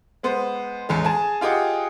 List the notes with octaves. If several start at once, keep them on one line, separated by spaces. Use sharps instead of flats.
G#3 B3 C5
A1 E2 G#3
G#4 G#5 A5
F4 G4 G#4 D#5 F#5